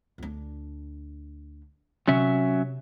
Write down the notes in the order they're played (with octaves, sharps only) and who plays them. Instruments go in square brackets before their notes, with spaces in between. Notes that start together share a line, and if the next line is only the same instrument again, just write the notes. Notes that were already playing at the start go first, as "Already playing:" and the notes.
[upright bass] D2 D4
[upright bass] C3 [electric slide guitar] F#3 C#4 E5